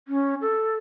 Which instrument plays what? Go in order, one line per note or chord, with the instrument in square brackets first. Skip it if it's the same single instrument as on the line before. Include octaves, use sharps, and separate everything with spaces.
[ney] C#4
A4